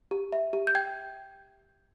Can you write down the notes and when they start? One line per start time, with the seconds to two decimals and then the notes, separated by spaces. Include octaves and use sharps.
0.11 G4
0.32 E5
0.53 G4
0.67 G6
0.75 G5 G#6